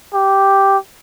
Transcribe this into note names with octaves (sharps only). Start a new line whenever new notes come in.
G4